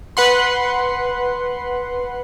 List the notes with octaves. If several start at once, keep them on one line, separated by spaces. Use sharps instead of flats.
B4 F#5 C6